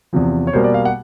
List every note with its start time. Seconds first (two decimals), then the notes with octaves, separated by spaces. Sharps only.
0.13 E2 C3 F3
0.47 C#5
0.53 B2 G3 A#3 C5
0.64 D5
0.74 F5
0.85 F#5